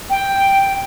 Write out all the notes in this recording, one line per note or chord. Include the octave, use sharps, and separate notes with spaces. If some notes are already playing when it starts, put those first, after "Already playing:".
G5